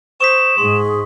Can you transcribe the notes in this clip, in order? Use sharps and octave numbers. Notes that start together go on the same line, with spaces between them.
C5 C#6 D#6 B6 E7
G#2 G#4 C6